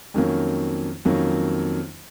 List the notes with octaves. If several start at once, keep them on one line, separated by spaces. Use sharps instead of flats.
F2 D#3 F#3 A#3 C#4
F2 D#3 F#3 A#3 C#4